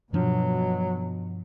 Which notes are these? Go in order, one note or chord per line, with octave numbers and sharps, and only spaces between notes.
G2 B2 F3 F#3 D4